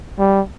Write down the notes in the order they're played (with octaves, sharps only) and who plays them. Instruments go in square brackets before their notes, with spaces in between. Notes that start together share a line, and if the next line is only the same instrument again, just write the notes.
[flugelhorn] G3